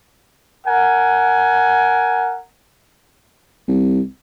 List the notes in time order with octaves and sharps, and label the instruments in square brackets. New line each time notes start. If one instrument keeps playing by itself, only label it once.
[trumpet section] A#4 F#5 G#5
[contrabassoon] C2